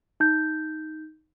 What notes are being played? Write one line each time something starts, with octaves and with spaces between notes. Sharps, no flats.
D#4 G6